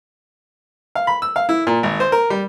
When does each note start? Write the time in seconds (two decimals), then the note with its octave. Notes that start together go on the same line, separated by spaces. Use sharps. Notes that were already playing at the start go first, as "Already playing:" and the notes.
0.95 F5
1.07 B5
1.22 E6
1.36 F5
1.49 E4
1.67 A#2
1.83 G#1
2.00 C5
2.12 A#4
2.30 G3